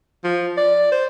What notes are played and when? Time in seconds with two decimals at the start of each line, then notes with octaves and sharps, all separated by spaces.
0.24 F3
0.57 D5
0.92 C5